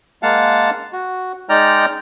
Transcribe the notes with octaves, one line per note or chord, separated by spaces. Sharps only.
G#3 A#3 F5 F#5 A5
F#4
G#3 D#4 D5 G5 A#5 F6